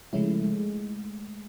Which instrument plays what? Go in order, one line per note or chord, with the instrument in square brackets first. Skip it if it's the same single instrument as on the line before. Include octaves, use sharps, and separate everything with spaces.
[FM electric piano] C#3 F3 G#3 C#4 E4 [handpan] A3
[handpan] G#3